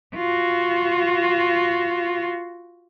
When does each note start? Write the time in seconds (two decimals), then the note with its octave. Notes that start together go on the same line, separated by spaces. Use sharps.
0.15 F4 F#4